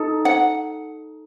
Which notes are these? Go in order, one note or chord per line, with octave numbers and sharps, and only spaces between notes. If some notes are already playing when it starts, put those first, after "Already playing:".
Already playing: D#4 A4
F#5